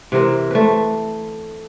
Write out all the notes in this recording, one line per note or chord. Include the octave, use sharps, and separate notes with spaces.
C3 E3 C4 A#4
A3 C4 B4